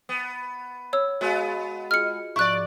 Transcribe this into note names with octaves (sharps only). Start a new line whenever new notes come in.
B3 D#6
C#5 E6
G#3 B3 F#4 F5
F4 G#4 D#5 F6 C#7
G#2 F3 E4 D5 C#6 F#6